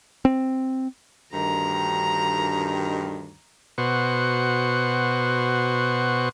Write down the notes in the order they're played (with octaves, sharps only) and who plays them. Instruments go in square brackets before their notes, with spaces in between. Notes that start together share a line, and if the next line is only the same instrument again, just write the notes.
[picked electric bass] C4
[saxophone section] D2 G2 D#3 [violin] A#5
[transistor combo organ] B2 F#4 C5 C#6